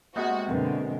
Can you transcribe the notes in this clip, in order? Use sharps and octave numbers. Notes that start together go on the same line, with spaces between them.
C3 G#3 A#3 B3 F#4
F#2 B2 D3 C4 A#4 B4